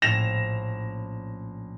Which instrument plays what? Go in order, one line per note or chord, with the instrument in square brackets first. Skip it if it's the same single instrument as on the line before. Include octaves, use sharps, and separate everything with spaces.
[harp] A#1 A2 C#4 [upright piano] A#6 E7 F7